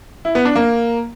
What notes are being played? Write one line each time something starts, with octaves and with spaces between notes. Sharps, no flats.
E4
B3
D4
A#3